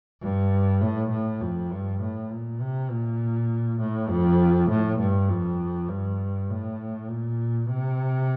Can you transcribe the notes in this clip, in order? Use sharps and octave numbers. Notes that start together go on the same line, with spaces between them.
G2
A2
A2
F2
G2
A2
A#2
C3
A#2
A2
F2
A2
G2
F2
G2
A2
A#2
C3